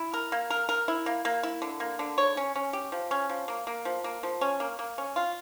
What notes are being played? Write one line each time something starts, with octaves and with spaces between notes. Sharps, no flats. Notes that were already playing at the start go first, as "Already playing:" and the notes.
Already playing: E4
A#4
A#3
A#4
A#4
E4
A#3
A#3
E4
D3
A#3
D3
C#5
C#4
C#4
G4
F3
C#4
F3
A#3
A#3
F3
A#3
F3
C#4
A#3
A#3
C#4
F4